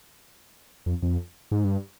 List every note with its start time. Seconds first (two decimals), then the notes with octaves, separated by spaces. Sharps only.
0.86 F2
1.02 F2
1.51 G#2
1.64 G2